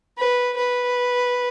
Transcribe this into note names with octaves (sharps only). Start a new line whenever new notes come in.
B4
B4